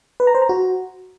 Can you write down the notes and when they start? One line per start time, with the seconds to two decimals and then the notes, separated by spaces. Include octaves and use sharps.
0.20 B4
0.27 A#5
0.35 C5
0.42 A#5
0.49 F#4